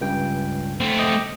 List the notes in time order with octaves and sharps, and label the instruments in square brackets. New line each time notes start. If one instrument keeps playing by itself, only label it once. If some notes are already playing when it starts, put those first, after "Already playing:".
[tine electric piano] C#2 G2 G5
[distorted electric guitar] A3 C4
[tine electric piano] D#5 G5 D6